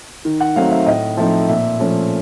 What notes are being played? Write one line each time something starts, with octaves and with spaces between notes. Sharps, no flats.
D#3
F#5
F#3 A3 C4 D#4 F5
E5
A2 D#5
F3 A3 C4 D#4 E5
A#2 E5
F3 A3 C#4